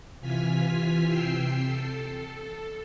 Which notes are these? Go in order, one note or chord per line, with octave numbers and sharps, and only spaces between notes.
C3 E3 F4 G#5 F6 B6
C3 G5 E6 C7
A4